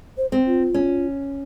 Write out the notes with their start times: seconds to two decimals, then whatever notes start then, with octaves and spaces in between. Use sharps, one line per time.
0.18 C5
0.32 C4
0.46 F4
0.74 C#4